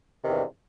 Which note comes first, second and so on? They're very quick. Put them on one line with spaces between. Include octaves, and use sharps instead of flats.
C3 D#3 E2 G2